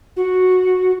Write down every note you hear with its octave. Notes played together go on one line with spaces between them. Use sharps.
F#4